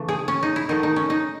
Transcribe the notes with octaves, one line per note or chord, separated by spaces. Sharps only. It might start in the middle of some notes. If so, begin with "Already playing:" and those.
Already playing: C#3 E3 A3
G#4
C#4
D#4
E4
D#3 F#3 A3 D#4
D#4
C#4
D#4